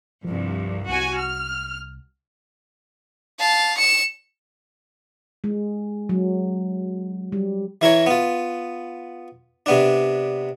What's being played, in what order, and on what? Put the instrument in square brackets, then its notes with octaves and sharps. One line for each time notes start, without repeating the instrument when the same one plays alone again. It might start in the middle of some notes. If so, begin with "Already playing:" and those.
[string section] C2 G2 [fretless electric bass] F3
[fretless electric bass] C2 [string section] F#4 G#5
[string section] F6
[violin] F5 A5
C#7 E7
[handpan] G#3
F#3
G3
[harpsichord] E3 E4 A#4 C#5
B3 F4
C3 B3 D4